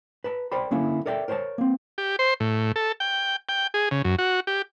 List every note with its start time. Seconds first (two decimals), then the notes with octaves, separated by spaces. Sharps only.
0.24 B4 A5 A#5
0.52 A#4 C5 D5 G5 B5
0.71 D3 A#3 C#4 E4
1.06 A4 A#4 D5 E5 G5
1.28 A#4 C5 C#5 G5 A5
1.58 A#3 C4
1.98 G4
2.19 C5
2.40 A2
2.76 A4
3.00 G5
3.49 G5
3.74 G#4
3.91 C#3
4.04 F#2
4.18 F#4
4.47 G4